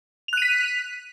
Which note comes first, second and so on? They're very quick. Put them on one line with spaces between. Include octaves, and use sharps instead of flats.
F7 F#6 D#7 B6